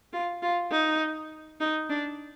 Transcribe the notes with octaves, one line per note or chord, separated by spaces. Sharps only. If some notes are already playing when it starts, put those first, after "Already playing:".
F4
F4
D#4
D#4
D4